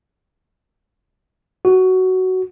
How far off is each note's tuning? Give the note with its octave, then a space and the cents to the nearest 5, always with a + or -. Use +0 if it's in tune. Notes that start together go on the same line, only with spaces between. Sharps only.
F#4 +10